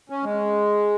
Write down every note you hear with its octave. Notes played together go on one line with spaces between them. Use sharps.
C#4
G#3